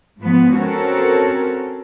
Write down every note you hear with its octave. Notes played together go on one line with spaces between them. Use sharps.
G#2 F3 B3
C4 C#4 F#4 A4 A#4